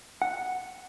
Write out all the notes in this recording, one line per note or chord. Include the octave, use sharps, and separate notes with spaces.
F#5